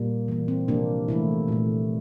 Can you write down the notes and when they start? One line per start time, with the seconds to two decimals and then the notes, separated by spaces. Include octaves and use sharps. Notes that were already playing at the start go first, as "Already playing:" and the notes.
Already playing: A#2 G3 A#3
0.28 E3 A#3
0.48 C4
0.68 C3 F3 A#3 D4
1.08 C3 E3 A3 E4
1.48 A#2 A3